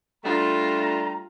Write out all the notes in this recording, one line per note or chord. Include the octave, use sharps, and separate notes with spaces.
G3 A3 D4 F4 A#5